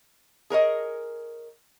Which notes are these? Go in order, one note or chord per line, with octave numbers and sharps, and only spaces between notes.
G#4 A#4 C#5 D#5